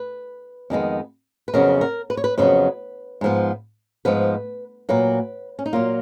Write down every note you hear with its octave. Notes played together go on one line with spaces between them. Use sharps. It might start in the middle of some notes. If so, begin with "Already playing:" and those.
Already playing: B4
F2 D#3 G#3 B3
B4
F2 C#3 F#3 B3 A#4
A#4
B4
C#5
B4
F2 C#3 F#3 B3 B4
G#2 F3 B3
G#2 F3 B3 B4
A#2 F#3 A#3 B4
C#4
D#4
A#2 F#3 A#3 F4